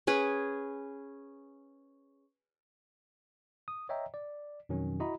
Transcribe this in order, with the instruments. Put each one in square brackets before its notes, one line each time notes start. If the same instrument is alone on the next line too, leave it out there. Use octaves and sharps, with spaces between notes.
[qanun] C#4 G#4 B4
[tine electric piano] D#6
C#5 D#5 E5 G5 A#5
D5
F2 B2 D#3 F#3 C#4
E4 F#4 D#5 A#5 B5